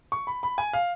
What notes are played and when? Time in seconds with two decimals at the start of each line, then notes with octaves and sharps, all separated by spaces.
0.12 C#6
0.27 B5
0.43 B5
0.58 G#5
0.73 F5